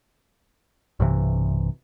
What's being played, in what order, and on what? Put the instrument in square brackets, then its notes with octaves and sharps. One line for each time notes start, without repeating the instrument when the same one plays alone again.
[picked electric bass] B1 G2 C3 E3